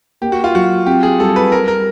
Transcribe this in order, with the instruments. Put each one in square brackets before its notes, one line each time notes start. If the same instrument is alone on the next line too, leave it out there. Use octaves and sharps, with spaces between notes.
[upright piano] A#3 [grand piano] G4
[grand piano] F#4
F4
[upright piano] F#3 [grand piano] F#4
[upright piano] C4 [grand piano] G4
[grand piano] G#4
[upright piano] G3 [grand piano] A4
[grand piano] B4
[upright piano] G3 [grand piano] A#4
[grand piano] A#4